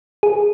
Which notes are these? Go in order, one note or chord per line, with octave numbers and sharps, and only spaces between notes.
G#4